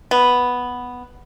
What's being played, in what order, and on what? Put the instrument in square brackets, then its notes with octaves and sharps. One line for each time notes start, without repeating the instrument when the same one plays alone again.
[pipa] B3